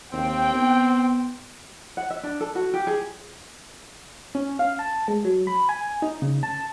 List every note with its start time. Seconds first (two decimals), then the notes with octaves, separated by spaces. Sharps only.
0.13 D#2 C4 G5
0.55 B3
1.97 F#5
2.10 E5
2.23 D4
2.40 A4
2.55 F#4
2.74 G4
2.87 G#4
4.35 C#4
4.59 F5
4.79 A5
5.08 G#3
5.25 F#3
5.47 B5
5.69 G#5
6.02 D#4
6.22 C#3
6.43 A5